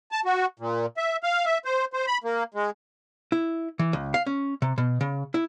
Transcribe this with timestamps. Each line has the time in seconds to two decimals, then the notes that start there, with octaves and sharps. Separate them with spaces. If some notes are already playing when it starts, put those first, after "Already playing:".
0.12 A5
0.25 F#4
0.59 A#2
0.97 E5
1.23 F5
1.45 E5
1.65 C5
1.93 C5
2.07 B5
2.24 A#3
2.54 G#3
3.32 E4
3.79 E3
3.93 C#2
4.14 F5
4.26 C#4
4.62 C3
4.78 B2
5.01 C#3
5.34 E4